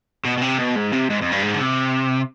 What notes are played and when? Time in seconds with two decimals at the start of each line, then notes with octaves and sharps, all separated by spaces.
0.25 B2
0.37 B2
0.42 C3
0.59 B2
0.76 G#2
0.92 C3
1.10 G#2
1.21 F2
1.32 G2
1.43 G#2
1.54 D3
1.60 C3